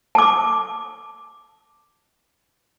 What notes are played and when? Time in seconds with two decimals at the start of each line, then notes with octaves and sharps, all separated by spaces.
0.15 A5 D6